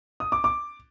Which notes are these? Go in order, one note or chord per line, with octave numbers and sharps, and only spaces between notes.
D#6
D6
D6